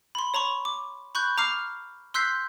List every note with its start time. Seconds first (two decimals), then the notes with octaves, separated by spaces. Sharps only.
0.15 B5 C6
0.34 C#5 A#5 B5 C#6
0.65 D6
1.15 B5 C#6 F#6 G6
1.38 A#5 D6 F6 C7
2.14 C6 E6 F#6 G6 B6 C7